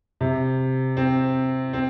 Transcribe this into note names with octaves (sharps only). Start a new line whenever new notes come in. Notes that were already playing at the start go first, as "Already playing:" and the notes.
C3
C4
C4